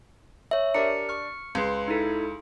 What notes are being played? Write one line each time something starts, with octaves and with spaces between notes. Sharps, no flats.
C#5 E5
D4 G4 A#4 A#5 C#7
C#6 F6
C#2 B4 C6
D#4 E4 A4